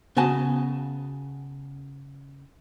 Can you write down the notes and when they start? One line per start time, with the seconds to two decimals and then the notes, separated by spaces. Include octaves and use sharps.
0.17 C#3 B3 F#4 G#5 A5